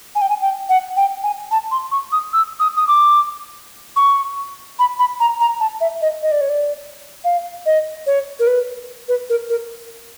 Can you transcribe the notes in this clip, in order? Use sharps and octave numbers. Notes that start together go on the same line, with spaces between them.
G#5
G5
G#5
G5
F#5
G5
G#5
A5
C6
C#6
D#6
E6
D#6
D#6
D6
C#6
B5
B5
A#5
A#5
A5
E5
D#5
D#5
D5
C#5
D5
F5
D#5
C#5
A#4
B4
B4
A#4
A#4